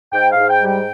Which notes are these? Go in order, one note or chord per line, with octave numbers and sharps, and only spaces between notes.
G#2 G5
F5
G#2
G5
G3
G5